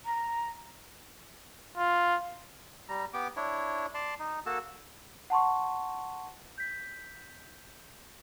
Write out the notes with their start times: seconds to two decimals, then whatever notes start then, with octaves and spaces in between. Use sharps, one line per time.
0.04 A#5
1.78 F4
2.89 G3 A#5
3.14 B3 G4 D6
3.37 D4 E4 C#5
3.94 D5 A5 C6
4.19 D#4
4.46 A#3 F#4 A4 A5
5.30 F#5 A5 C6 C#6
6.58 G6 B6